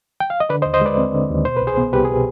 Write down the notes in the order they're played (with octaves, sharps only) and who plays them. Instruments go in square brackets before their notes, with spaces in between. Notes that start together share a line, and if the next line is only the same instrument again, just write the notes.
[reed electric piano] G5
F5
D#5
D3 B4 D5
C5 D#5
D#2
C5 D#5
G#3 B4 D5
C4
D3
D#2
B2 C5
C2 B4
G#4 C5
B3
C2 G4 B4
G#4
B2